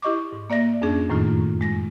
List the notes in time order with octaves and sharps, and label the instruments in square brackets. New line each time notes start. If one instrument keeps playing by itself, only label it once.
[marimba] E4 G4 D#5 C#6 D6
G#2
A#3 D5 E5 A#6
F2 C#4 D4 G#4
F#2 A2 D#3 A3 D#4 F4
F#2 G#3 A#6